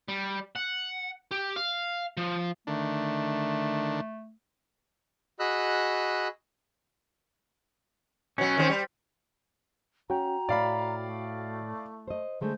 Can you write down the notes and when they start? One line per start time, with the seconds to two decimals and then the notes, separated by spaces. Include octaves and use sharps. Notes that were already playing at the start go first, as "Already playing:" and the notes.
0.08 G3
0.56 F#5
1.31 G4
1.56 F5
2.17 F3
2.67 D3 D#3 A3 D4
5.40 F#4 G#4 D#5 B5 E6 F#6
8.38 B2 F#3 C#4
8.57 D#3 G3 C4
8.70 G3
10.10 C#4 F#4 G5 A#5
10.49 A2 D5 F5 B5
11.05 A3
12.08 C5 D#5
12.41 D3 G#3 A3 C5